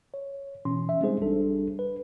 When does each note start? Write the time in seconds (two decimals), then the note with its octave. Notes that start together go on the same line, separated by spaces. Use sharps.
0.14 C#5
0.65 B2 E3 C#4 C6
0.89 E5
1.00 G3 G#3 C4 D#4 G#4 C5
1.21 A1 G3 D4 A4
1.79 B4